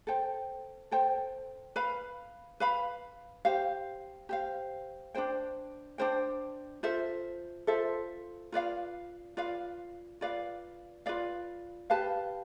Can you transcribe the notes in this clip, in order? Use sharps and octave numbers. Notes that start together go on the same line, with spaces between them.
A4 C5 G5
A4 C5 G5
B4 F5 B5
B4 F5 B5
G4 C5 F5
G4 C5 F5
D4 F4 C5 G5
D4 F4 C5 G5
F4 A4 C5 E5
F4 A4 C5 E5
F4 B4 D5 F5
F4 B4 D5 F5
F4 B4 D5 F5
F4 B4 D5 F5
G4 B4 F5 A5